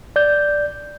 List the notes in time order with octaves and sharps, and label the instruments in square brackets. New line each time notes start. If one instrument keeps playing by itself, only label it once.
[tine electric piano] D5 G6